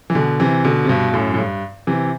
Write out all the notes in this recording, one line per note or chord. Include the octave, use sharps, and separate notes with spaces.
E3
B2 D3
C3 E3
B2 D3
C3
G2 B2
G2
F#2 A2
A2
G2
C3 E3